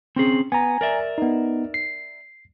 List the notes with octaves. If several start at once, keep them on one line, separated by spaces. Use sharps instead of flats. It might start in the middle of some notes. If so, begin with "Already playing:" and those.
C4 C#4 G#4
B3 G#5 A#5
A#4 D5 E5
B3 D#4
C7